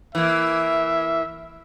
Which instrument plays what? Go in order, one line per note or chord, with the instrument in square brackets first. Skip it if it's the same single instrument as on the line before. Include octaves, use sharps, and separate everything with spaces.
[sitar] E3 A#3 [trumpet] E5